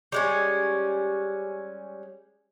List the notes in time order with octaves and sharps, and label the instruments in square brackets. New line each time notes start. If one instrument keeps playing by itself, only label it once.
[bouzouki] G3 G#3 C#4